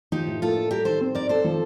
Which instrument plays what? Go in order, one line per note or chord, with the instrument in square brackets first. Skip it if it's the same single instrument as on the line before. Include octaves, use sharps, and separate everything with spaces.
[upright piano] F3 [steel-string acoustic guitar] D#4 G4
[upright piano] A2
[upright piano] A#3 [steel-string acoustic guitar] F4 A4
[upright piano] D4
[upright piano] G3 [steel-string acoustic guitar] G4 A#4
[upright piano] D#3 [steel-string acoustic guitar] A4 C5
[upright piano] C4
[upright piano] D#4 [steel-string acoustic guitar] A#4 D5
[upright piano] C4 [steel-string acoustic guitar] A4 C5
[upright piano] F3